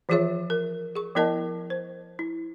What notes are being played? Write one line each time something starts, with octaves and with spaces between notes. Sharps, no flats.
E3 F3 F4 G#4 C#5 E5
A#4
G#4 C#6
F3 B3 E4 A#4 D#5 A5
C5
E4